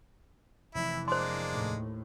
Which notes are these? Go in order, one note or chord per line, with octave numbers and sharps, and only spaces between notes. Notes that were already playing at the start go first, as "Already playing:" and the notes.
F1 E3 E4
G#3 A#3 D4 C5 C6
D#2 A2